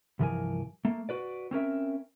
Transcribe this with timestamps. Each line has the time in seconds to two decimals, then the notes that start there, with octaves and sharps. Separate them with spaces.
0.19 C2 G2 E3 F3 A#4 G#5
0.85 A3 A#3
1.09 F#4 B4 D5
1.51 C4 C#4 A#4 E5